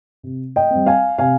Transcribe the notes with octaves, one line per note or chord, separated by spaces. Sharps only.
C3
D#5 G5
G3 C4
F5 G#5
C3 F5 G#5